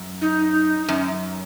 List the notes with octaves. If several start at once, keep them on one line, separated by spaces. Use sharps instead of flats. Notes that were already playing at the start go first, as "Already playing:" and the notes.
Already playing: F#2
D#4
F#2